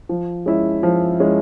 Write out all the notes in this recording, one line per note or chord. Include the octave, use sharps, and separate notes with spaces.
F3
G#3 C#4 E4
F3
G#3 C#4 E4